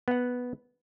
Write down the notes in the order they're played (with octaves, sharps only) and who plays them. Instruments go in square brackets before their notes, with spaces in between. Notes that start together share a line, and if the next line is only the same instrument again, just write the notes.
[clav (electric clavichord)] B3 F#5